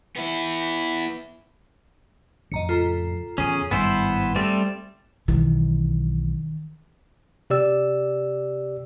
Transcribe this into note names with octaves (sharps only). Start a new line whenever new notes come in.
B3 E4
F2 A2 C#3 D#5 A#5 C#7
F4 A4 A#5
E2 A2 C#3 C#4 G#4
G#1 G2 G3 B3 E4 C5 G#5
G3 A3 C4 A6 E7
B1 D#3 E3
C3 G4 D5 E6